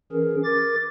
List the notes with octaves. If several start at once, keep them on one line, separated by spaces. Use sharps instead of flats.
E3 C#4 G#4 A#4
A#4 D6 A6